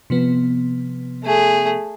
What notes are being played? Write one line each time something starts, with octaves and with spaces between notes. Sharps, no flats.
C3 F3 B3
A3 G#4